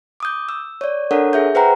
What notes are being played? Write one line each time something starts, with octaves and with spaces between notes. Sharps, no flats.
D6 D#6 G6
E6
C#5 D5
D4 A4 A#4 C#5 F#5
G#4 E5 G6
G#4 B4 C5 F#5 G5 A#5